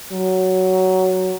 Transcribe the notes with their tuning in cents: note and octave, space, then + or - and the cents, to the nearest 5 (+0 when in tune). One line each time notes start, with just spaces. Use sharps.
F#3 +10